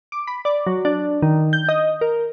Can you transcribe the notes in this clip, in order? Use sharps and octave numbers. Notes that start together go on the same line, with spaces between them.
D6
B5
D5
F#3
D4
D#3
G6
D#5
A#4